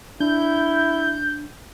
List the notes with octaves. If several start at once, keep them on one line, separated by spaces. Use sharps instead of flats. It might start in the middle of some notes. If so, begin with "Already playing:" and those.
D4 E4 G6